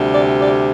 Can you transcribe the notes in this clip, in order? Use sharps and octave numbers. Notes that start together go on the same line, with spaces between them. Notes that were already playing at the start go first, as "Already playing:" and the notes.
Already playing: D2 C3 G3
D5
D5